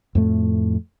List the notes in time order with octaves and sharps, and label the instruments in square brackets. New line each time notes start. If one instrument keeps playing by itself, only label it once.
[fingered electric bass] F2 A2 A3